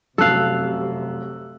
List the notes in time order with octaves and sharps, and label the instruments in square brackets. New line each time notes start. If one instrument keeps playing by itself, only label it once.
[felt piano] F1 F#2 [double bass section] C3 [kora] A4 F5 [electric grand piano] E6 F#6